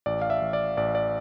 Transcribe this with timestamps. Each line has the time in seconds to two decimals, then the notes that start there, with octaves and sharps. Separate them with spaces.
0.06 A1 D5
0.22 F5
0.30 E5
0.42 A1
0.53 D5
0.77 A1 D5
0.95 D5